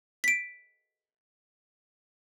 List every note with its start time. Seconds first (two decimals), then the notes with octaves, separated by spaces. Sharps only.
0.24 B6 D7